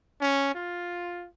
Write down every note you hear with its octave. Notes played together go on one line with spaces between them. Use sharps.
C#4
F4